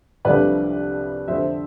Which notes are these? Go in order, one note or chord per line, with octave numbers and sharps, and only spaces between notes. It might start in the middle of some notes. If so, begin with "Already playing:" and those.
C2 C3 F3 A3 D4 B4 D5
F2 D3 A3 C5 E5